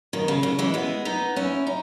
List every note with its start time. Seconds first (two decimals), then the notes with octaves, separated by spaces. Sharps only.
0.13 B2 D#3
0.28 C#3
0.43 C#3
0.59 E3 G#3
0.74 G#3 B3
1.05 B3 D#4
1.36 C#4 E4
1.67 D#4